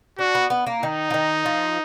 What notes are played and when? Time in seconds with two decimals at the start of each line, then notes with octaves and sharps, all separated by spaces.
0.19 D4 F#4
0.35 B3
0.50 B3
0.67 A#3
0.82 D#3 D#4
1.10 F3
1.14 D#3
1.46 F3